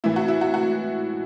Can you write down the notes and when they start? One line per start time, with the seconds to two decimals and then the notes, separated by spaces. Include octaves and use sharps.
0.04 A2 E3 E4
0.16 F#4
0.28 E4
0.41 F#4
0.54 F#4